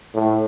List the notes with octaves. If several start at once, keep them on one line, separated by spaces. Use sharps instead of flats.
A2